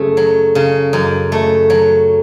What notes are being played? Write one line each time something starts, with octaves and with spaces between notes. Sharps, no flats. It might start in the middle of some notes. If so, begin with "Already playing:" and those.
Already playing: F#2 C#3 A3
F#3
C#3
F#2
A3
F#3